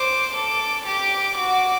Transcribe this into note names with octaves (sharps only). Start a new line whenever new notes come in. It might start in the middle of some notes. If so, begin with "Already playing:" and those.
Already playing: C5 D6
A4 D6
G4 D6
F#4 D6